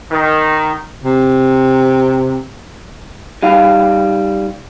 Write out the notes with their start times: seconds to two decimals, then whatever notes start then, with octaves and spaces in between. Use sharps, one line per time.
0.10 D#3
1.04 C3
3.43 G3 D#4 F5